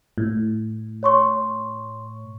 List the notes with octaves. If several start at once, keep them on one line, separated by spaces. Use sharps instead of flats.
A2
C#5 C6 C#6